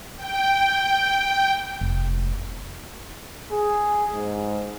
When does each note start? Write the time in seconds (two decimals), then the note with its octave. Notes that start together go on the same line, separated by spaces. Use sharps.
0.17 G5
1.81 F1
3.52 G#4
4.14 G#2